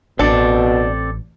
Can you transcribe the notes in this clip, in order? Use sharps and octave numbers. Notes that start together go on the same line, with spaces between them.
A1 B2 C4 D4 A4 D5